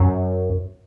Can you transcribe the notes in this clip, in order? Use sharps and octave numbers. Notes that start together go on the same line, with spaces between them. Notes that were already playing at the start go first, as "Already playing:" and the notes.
Already playing: F#2